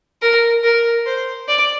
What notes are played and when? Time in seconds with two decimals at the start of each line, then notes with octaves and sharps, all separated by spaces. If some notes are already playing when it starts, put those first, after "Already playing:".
0.22 A#4
0.63 A#4
1.06 C5
1.48 D5